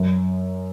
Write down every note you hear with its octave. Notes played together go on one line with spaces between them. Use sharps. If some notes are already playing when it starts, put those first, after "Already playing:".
Already playing: F#2